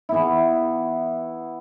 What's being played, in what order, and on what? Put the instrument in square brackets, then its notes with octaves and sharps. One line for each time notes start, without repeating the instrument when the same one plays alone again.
[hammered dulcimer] E3 B3 E4